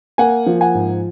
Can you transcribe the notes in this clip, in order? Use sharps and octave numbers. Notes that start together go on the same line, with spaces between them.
A#3 F#5 G#5
F3
F#5 G#5
G#2